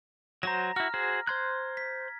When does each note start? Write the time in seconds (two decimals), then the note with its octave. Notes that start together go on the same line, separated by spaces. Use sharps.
0.43 F#3 F#4 C5 A#5 A#6
0.76 E4 F#4 F6
0.94 F#4 G#4 C5
1.27 C5 C6 F#6 G#6
1.77 B6